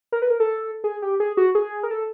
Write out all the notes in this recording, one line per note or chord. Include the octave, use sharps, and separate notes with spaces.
A#4
B4
A#4
A4
G#4
G4
G#4
F#4
G#4
A#4
A4